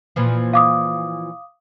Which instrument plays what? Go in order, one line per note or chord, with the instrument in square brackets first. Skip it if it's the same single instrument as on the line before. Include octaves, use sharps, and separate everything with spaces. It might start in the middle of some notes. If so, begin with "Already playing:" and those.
[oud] A#2 E3 F3
[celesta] F5 D6 D#6